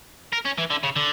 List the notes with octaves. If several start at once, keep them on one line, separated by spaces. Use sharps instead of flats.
A#4
C#4
E3
D3
C#3
D3